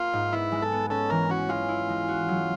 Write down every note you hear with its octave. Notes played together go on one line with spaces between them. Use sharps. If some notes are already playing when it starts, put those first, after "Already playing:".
Already playing: A#3 F4
G#2
B3 E4
G#3
A4
B3
C#4 A4
E3 A#4
C#4 F#4
G#3 F4
E4
G#3
F#4
F#3